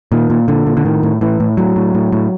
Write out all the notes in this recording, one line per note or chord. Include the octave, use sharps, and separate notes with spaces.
A#2 D#3
A#2
A#2 D3
A#2
D3
A2 D#3
A2
A2 E3
A2
A2 F#3
A2
A2
A2